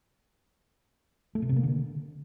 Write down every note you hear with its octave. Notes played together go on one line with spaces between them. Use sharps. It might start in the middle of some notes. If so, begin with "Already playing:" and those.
A3
B2
C3
A#3
D3